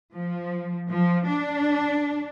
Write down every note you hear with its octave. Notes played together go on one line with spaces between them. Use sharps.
F3
F3
D4